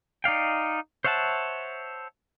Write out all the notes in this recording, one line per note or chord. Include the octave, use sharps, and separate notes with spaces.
D#4 D5 F5 G5
C5 C#5 E5 F#5 A5